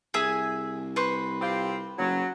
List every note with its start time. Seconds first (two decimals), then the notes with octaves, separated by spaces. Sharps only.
0.14 C2 G#4 E5 G#5
0.96 B4 C5 C#6
1.41 C4 F4 G4
1.98 F#1 F#3